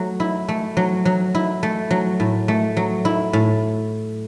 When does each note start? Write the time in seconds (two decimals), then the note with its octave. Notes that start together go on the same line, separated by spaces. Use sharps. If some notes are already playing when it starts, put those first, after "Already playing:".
Already playing: F#3 A3
0.20 E4
0.49 A3
0.77 F#3
1.05 F#3
1.35 E4
1.63 A3
1.91 F#3
2.20 A2
2.48 A3
2.77 F#3
3.05 E4
3.33 A2